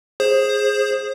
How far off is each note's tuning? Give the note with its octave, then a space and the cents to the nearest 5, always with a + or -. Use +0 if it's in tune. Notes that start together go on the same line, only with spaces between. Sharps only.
G#4 +0 C5 +25